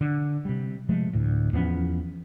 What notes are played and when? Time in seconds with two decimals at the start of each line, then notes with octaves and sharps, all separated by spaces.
0.01 D3
0.45 C3 G3
0.89 C3 F3 G#3 A3
1.13 D2 A2
1.53 E2 F3 B3 C#4